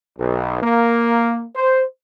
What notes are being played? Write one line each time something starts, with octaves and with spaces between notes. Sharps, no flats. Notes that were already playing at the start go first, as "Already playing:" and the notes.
B1
A#3
C5